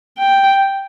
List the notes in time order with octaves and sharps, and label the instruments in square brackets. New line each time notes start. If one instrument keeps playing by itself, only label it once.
[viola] G5